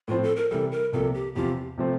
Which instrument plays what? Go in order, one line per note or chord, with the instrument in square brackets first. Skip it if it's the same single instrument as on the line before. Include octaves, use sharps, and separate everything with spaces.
[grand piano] A2 F3 C4 [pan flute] F4
[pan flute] A4
A#4
[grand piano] C3 E3 G3 [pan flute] A4
[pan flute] A#4
[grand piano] C2 C3 F3 A#3 [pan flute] A4
[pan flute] G4
[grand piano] E2 C3 F3 C4 F4 [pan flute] G4
[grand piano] C3 F3 A3 C4